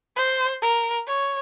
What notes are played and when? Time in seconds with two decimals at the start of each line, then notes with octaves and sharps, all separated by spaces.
0.16 C5
0.62 A#4
1.07 C#5